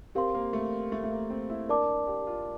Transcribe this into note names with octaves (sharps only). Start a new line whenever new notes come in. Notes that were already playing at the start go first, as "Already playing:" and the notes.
C4 G4 A#4 F5 C6
A#3
A3
A3
A3
A#3
C4
E4
D4 A#4 D5 A5 D6
G4
G4
F4